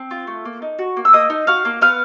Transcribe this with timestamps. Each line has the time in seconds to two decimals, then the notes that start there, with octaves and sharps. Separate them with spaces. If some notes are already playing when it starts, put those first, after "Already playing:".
Already playing: C4
0.11 F4
0.27 A3
0.45 A#3
0.62 D#4
0.79 F#4
0.97 A#3
1.05 E6
1.13 A#3 D#5 D#6
1.30 D#4
1.47 F#4 F5 F6
1.65 A#3
1.81 B3 F5 F6